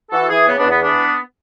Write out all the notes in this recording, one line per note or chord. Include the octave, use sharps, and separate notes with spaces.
E3 F#4 A4
E3 E4 G#4
C#3 B3
B3 D4
E2
B3
E3 B3 D4